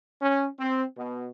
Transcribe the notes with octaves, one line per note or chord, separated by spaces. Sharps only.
C#4
C4
B2